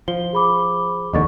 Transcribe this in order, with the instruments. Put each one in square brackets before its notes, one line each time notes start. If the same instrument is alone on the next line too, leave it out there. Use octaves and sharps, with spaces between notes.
[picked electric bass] F3 [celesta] G7
[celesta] G#4 B5 D6
[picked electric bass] F1 D#2 D3 [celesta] D#5 C#6 A6